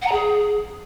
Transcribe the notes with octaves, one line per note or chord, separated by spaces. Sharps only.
F#5
A#5
G#4